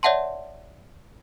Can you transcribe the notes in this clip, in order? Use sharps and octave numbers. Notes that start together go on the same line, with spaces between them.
C#5 D5 E5 F#5 A5 C6